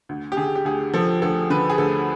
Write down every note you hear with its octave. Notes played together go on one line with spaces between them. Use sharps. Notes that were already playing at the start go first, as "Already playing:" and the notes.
D2
G4
D3 G#4
G4
D2 G#4
F3 A4
D2 A4
D3 B4
G#4
D2 A4